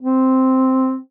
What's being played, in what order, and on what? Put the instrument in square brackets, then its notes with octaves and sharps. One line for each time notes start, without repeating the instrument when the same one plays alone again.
[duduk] C4